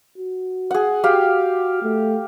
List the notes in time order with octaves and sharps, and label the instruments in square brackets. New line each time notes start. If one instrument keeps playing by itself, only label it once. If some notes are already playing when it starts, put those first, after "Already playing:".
[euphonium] F#4
[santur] G#4 F#5
[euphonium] F#4 [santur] G4 F5 G5
[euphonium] A3